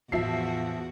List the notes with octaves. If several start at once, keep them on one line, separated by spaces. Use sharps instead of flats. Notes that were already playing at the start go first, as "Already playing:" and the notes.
E2 A2 E3 F3 F#4 E5 C7